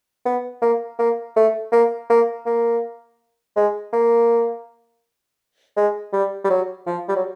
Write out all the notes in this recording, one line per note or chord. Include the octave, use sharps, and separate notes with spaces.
B3
A#3
A#3
A3
A#3
A#3
A#3
G#3
A#3
G#3
G3
G3
F#3
F3
G3
F#3